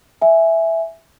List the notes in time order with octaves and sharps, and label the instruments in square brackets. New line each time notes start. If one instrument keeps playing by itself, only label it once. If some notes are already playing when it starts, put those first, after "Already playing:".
[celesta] E5 G#5